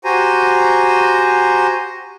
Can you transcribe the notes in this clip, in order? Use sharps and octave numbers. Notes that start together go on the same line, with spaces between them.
F#4 G4 C5 G#5 A#5